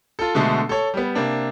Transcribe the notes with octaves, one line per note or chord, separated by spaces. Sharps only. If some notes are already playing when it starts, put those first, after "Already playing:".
F4 A4
B2 D3 G#3 A3
A4 C#5
G3 B3
C3 A#3 D4